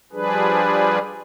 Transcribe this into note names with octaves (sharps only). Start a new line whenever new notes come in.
F3 G3 D4 G#4 B4